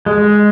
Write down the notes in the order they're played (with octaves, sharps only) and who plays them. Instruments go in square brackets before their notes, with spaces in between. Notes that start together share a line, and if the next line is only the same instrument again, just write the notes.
[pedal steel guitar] G#3